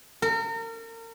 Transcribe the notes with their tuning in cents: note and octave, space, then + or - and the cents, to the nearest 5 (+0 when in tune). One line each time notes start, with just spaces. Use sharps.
A#4 -35